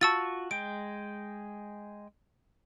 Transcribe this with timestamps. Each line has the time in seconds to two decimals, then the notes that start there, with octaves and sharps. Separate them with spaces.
0.01 F4 F#4 A5 C#6 E6 A6
0.51 G#3 G5 D7